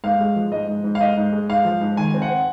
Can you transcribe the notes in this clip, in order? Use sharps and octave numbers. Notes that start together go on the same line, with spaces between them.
G#2 F5
G#3
F3
G#2 D#5
G#2
G#2
F5
G#2 D#5
G#2
G#3
G#2 F5
F3
G#2
D#3 G#5
C4
F#5
C4